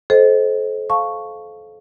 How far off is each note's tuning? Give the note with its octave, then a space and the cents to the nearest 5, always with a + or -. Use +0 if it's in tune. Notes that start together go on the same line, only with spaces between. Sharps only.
A4 -30 C5 +0 D#5 +0
F5 +0 A5 +0 C#6 +0